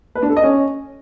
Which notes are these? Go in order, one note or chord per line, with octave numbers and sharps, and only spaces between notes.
B4
D4
A4
D#5
C#4